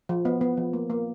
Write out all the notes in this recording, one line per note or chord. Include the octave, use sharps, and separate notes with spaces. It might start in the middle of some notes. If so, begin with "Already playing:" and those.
F3
B3
B3
F3
A#3
A#3